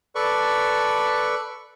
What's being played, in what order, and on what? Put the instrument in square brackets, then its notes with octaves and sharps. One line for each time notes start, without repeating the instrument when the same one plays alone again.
[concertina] A4 B4 D5 C#6